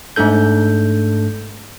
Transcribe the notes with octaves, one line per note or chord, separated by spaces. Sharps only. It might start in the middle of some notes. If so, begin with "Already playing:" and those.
G#2 A3 D4 A4 G6